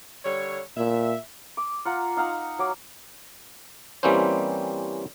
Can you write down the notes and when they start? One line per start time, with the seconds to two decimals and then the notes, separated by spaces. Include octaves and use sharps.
0.25 D3 G3 C#5
0.77 A#2 E5
1.57 D6
1.85 F4 F#5 A#5
2.17 D#4 F5 F#5 A#5
2.59 F#3 D6
4.03 E3 G3 A#3 C4 C#4 C5